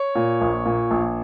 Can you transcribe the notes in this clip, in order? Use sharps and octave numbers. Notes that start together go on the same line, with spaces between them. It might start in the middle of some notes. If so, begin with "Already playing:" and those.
Already playing: C#5
A#2
A#1
A#2
A#1